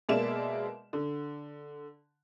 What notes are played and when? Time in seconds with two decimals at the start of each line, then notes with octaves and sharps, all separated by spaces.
0.09 B2 G#3 A#3 D5 E5 E7
0.93 D3